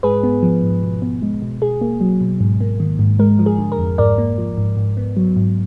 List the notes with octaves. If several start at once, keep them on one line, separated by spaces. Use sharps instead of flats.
G#2 G#4 B4
B3
F3
G#2
B2
B3
G#3
B2
B2 G#4
A#3
F#3
B2
G#2
A#3
D#3
G#2
G#3 A#4
F3
G#4
D3
A#4
F2
G#2 A#4 D5
A#3
F3
G#2
G#2
B3
F#3
G#2